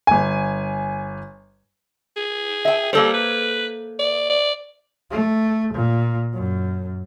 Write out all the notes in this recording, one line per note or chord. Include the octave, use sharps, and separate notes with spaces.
G1 G#5
G#4
E5 G5
G3 A#3 A4 C5
B4
D5
D5
A3
A#2
F#2